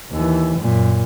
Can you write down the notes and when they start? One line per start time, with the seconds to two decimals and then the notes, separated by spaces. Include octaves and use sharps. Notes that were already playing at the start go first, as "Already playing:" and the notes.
0.11 D#2 E3
0.58 F#2 A#2